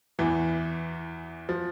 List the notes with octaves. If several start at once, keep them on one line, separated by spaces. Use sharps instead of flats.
E2 E3
F3